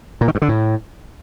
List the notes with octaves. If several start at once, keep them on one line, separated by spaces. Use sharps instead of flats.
A#2
D#3
G2
D3
A2